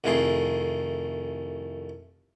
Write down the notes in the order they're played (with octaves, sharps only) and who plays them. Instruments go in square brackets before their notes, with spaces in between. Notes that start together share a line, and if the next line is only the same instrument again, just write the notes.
[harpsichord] C2 F2 D#3 A3 G#4 C6